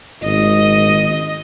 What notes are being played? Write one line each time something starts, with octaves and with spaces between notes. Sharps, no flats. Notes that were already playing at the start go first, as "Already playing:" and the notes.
G#1 D#5